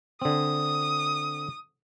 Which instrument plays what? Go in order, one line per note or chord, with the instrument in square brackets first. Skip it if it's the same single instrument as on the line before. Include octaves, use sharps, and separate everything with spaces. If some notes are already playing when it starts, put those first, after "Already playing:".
[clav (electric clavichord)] D3 C4 [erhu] D#6